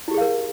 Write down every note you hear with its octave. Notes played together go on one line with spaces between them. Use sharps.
E4 G4 G#4 A#4 F5